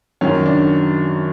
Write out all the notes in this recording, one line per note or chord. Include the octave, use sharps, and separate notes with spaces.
F#2 D#3 C#4
D4